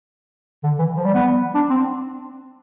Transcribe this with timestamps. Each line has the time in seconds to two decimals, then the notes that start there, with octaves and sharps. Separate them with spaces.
0.64 D3
0.79 E3
0.97 F3
1.05 G3
1.14 B3
1.55 D4
1.70 C4